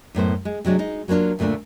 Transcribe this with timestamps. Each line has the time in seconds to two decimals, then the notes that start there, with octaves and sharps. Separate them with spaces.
0.15 F#2 A2 B3 C5
0.45 G#3
0.65 C3 F#3 G#3 D4
0.79 G#3 D#4
1.08 F#3 A#3 B3 D4 F4
1.39 D2 A#2 D3 A3 D4